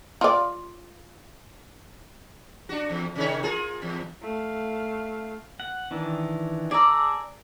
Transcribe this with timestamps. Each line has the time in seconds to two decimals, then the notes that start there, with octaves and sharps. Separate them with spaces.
0.21 F4 D5
2.69 D4 F#4
2.90 E2
3.16 C3 D#3 C#5
3.43 F4 G#4 A#4
3.82 E2
4.22 A3 F5
5.60 F#5
5.91 D#3 E3 D4
6.71 G#4 D5 A5 A#5 E6